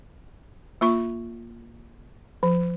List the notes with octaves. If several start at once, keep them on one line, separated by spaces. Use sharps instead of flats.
A#3 F4 C#6
F3